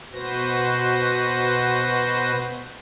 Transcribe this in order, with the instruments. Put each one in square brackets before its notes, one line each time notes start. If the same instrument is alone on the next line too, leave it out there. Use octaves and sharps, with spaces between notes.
[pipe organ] B2 F#4 B4 C5 A#6